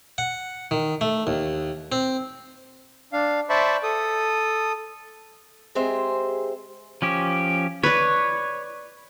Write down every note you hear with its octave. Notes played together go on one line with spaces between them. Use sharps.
F#5
D#3
A3
D#2
C4
D4 F5
C5 D5 E5 A5 B5 C#6
A4 D#6
G#3 C4 G4 G#4 C5 E5
F3 C#4 G4
B4 C#5 D5